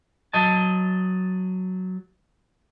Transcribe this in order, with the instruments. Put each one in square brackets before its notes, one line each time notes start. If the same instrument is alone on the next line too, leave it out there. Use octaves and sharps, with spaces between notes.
[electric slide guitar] F#3 D#5 A5